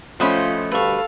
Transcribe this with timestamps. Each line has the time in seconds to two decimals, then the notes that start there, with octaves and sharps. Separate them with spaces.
0.20 F3 A3 C#4 F4 F#4 C5 D#5 B5
0.72 D2 G3 A4 B4 F5 C#6